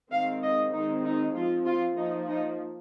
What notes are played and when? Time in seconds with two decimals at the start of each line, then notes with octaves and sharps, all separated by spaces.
0.11 D#3 G#3 C4 F5
0.42 D#5
0.73 D#3 G#3 C4 D#4
1.05 D#4
1.35 F3 C4 F4
1.66 F4
1.97 F3 A#3 D#4
2.28 D#4